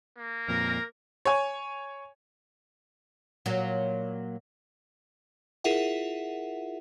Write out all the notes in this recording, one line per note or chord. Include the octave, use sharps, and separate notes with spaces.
A#3
F2 A#2 A#4
C#5 G#5
A#2 F#3
E4 F4 G#4 A#4 E5 F#5